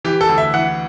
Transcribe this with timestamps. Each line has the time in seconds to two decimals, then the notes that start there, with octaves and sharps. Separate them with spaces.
0.05 E3 G4
0.21 A4
0.29 D2
0.38 E5
0.54 E3 F#5